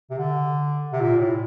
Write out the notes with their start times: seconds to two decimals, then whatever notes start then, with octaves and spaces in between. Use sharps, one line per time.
0.10 C3
0.18 D3
0.92 C3
1.01 A#2
1.19 A2